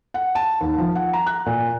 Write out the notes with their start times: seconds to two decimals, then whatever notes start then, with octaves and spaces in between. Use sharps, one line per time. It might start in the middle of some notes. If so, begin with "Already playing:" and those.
0.14 F#5
0.35 A5
0.61 D#2
0.78 F3
0.95 F#5
1.13 A#5
1.26 F#6
1.46 A#2